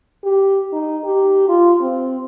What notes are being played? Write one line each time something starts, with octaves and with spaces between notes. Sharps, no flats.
G4
D#4
G4
F4
C4